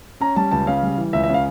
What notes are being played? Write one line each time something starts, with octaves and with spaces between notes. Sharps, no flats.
C#4 A#5
G3 A5
C#2 A5
C#3 F5
G3
E3
C#2 E5
E5
C#3
F5